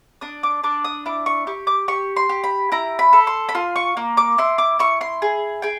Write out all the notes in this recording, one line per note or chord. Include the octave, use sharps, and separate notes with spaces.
D4 D#6
D6
D4 D6
D#6
E4 D6
C#6
G4 C#6
D6
G4 C#6
C6
G4
B5
E4 A#5
B5
A4
C6
B5
F4 C6
C#6
A#3
D6
E4 C6
D6
E4 C#6
C6
G#4
G#4 G5